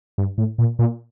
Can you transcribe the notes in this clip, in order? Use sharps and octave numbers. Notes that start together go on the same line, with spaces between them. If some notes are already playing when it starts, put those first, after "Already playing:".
G2
A2
A#2
A#2